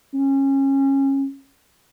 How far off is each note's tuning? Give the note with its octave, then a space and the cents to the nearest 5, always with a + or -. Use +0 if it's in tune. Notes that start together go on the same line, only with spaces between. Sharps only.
C#4 -25